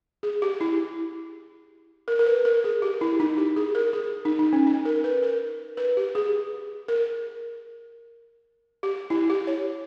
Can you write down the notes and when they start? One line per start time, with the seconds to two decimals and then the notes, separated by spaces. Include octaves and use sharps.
0.23 G#4
0.42 G4
0.61 E4
2.08 A#4
2.19 A#4
2.26 B4
2.45 A#4
2.64 G#4
2.82 G4
3.01 E4
3.20 D#4
3.37 G4
3.56 G#4
3.75 A#4
3.93 G#4
4.25 D#4
4.39 D#4
4.53 C#4
4.67 D#4
4.85 A#4
5.04 B4
5.23 A#4
5.77 B4
5.97 G4
6.15 G#4
6.88 A#4
8.83 G4
9.10 E4
9.30 G4
9.47 C#5